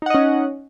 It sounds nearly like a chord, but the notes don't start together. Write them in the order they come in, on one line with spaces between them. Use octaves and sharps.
D#4 F#5 D#5 C#4